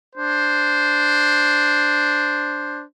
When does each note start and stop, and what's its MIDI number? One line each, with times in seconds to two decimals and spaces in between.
0.15 2.84 62
0.15 2.84 72